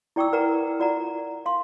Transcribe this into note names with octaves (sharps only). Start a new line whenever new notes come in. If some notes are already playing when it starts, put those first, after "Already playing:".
E4 D5 G5 C#6 D6 E6
A#4 B4 D5 F#5 G#5 A#5
F4 D5 F#5 A#5
F5 C6